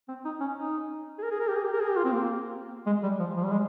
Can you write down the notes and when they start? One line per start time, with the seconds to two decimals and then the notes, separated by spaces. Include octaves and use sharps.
0.09 C4
0.25 D#4
0.40 C#4
0.57 D#4
1.18 G#4
1.23 A#4
1.31 G#4
1.40 A#4
1.48 G4
1.56 G#4
1.64 G4
1.72 A#4
1.80 G#4
1.89 G4
1.97 F4
2.05 C4
2.12 A#3
2.86 G#3
3.03 G3
3.20 F3
3.37 F3
3.45 G3
3.52 G#3